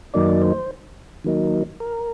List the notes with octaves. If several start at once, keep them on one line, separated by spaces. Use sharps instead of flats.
F#2 D#3 F#3 A#3 D#4 D5
C5
D#3 F#3 A#3 D#4
A#4